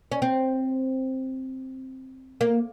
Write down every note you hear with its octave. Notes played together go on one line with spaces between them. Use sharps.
C#4
C4
A#3